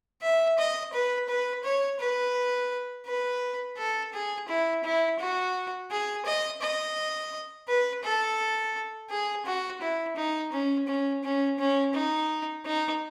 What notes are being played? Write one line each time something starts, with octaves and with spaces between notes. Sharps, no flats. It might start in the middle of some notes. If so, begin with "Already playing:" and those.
E5
D#5
B4
B4
C#5
B4
B4
A4
G#4
E4
E4
F#4
G#4
D#5
D#5
B4
A4
G#4
F#4
E4
D#4
C#4
C#4
C#4
C#4
D#4
D#4